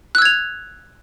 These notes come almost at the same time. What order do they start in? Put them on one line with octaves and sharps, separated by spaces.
F#6 E6 G#6 F7